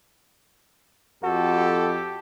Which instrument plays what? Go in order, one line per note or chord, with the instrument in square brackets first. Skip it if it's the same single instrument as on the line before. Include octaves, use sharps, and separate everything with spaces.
[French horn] F2 [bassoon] F#4 [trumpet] G4 [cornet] A4